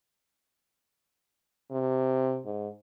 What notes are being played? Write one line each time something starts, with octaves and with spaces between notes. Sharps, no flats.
C3
G#2